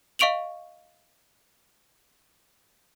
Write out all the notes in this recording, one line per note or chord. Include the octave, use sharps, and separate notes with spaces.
D#5 F5 C#6 D7 F7 F#7